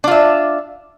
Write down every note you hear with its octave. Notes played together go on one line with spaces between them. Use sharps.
D4 F4 E5